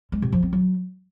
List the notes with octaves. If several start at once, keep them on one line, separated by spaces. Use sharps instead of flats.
G#3
C3
F3
C4
F#3